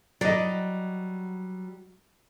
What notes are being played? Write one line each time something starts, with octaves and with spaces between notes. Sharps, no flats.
F#3 G3 D5 D#5